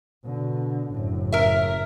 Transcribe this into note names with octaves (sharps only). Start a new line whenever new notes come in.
B2 D3
F#1 A2
A#4 E5